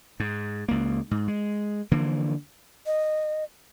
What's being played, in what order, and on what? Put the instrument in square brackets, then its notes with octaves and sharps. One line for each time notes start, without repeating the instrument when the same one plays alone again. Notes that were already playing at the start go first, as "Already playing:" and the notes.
[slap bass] G#2
C#2 A#3
G#2
G#3
D3 E3 F3 A#3
[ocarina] D#5